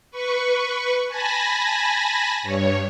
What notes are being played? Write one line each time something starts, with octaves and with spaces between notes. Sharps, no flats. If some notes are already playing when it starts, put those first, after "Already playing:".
B4 C#6
G#5 A5 B5 A#6
G2 C#5